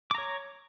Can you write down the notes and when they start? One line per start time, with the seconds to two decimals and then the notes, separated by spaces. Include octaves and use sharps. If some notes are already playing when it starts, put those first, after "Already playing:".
0.11 D6
0.15 A#5
0.18 C#5